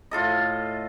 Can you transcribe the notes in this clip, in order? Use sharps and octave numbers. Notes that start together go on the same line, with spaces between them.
A2 F4 A4 D#5